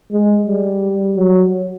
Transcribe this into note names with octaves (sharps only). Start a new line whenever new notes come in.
G#3
G3
F#3